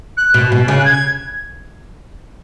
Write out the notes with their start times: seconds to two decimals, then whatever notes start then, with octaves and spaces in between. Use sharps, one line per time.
0.17 F#6
0.34 B2
0.52 B2
0.68 C#3
0.79 F#6
0.85 G#6